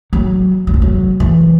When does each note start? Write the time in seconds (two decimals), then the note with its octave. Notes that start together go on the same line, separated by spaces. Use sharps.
0.13 F#3
0.67 F#3
0.74 E3
0.82 F#3
1.20 E3